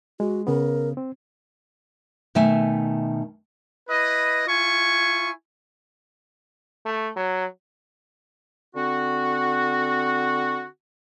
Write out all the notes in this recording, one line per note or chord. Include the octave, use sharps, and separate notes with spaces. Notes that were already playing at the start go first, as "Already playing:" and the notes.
G#3 F#4
C#3 B3 A#4
C4
B2 D#3 A3 E5 G#5
E4 B4 D#5
E4 F4 G#5 C#6
A3
F#3
D3 C4 F#4